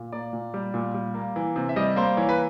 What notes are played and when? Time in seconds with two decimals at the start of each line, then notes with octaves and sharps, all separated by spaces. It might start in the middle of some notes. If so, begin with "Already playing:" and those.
Already playing: A#2
0.12 A#3 D5
0.33 A#2
0.54 G3
0.74 A#2
0.94 G3
1.14 A#3
1.36 E3
1.56 C3
1.69 E5
1.76 G3 D#5
1.96 A#3 C5
2.17 E3 C#5
2.29 B4